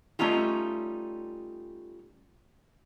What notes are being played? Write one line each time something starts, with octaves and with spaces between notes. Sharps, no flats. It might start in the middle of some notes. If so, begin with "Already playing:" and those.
G3 A3 C#4 D#4 F4 G4